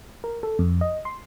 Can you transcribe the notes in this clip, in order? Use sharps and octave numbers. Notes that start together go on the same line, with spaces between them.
A#4
A4
F2
D#5
C6